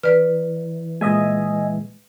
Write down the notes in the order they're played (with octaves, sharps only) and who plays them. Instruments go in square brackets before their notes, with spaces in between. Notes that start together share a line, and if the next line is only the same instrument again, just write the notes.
[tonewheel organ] E3 [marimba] B4 D5 F6
[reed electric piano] A#2 G#3 [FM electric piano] D#5 E5 G#5